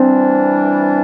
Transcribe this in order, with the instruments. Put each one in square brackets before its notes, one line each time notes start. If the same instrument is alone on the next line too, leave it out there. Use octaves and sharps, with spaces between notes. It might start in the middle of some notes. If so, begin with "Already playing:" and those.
Already playing: [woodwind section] E3 G3 D4 [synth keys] C4